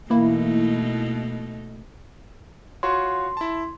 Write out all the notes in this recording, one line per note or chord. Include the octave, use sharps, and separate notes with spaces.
B2 E3 A3 A#3 D#4 E4
F4 F#4 C#5 C6
E4 A5